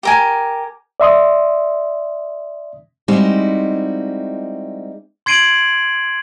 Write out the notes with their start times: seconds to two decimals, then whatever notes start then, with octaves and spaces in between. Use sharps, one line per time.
0.03 G4 A#4 G#5
1.00 D5 E5 C6 D#6
3.08 G3 G#3 C4 D#4 E4 F#4
5.26 C6 G#6 C7 D7 D#7 F#7